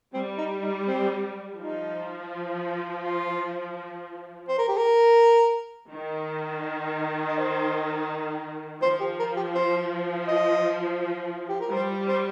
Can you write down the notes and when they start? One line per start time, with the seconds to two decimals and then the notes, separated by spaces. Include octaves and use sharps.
0.13 G3 C4
0.38 D#4
0.62 D#4
0.87 C4
1.58 F3 D#4
3.03 F4
4.48 C5
4.58 A#4
4.68 G4
4.77 A#4
5.93 D#3
7.27 D#5
7.38 C5
8.82 F3 C5
9.00 G4
9.19 A#4
9.36 G4
9.55 C5
10.28 D#5
11.49 G4
11.61 A#4
11.72 G3 C5
12.08 C5